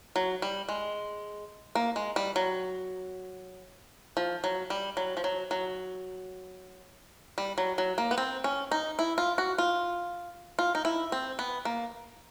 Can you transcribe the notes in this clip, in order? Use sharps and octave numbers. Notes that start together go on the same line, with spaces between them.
F#3
G3
G#3
A#3
G#3
G3
F#3
F3
F#3
G3
F#3
F3
F#3
F#3
G3
F#3
F#3
A#3
B3
C4
C#4
D#4
E4
F4
F#4
F4
F4
D#4
E4
C4
B3
A#3